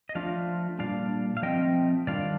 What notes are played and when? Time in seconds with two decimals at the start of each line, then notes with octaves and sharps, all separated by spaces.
0.09 D#5
0.15 F3 A3 D4 F4 D5 F5
0.79 A#2 G3 D4 F4 D5 F5
1.37 F5
1.42 F3 A3 C4 D#5 G5
2.07 D#3 G3 D4 F4 D5 F5